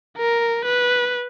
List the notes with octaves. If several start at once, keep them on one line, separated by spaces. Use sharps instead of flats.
A#4
B4